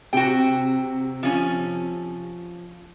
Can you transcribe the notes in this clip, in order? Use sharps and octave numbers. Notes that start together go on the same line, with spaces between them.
C3 F#4 G5
F3 C#4